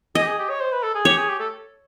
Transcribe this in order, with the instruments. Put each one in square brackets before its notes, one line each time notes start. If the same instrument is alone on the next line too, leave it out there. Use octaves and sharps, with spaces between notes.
[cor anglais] G#4 [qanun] D#5
[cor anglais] G4
G#4
G4
C#5
C5
B4
A4
G#4
[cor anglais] G4 [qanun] C#5
[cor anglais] G#4
G4
A4